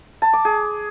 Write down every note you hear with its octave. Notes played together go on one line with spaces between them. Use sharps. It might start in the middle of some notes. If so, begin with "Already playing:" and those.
A5
D6
G#4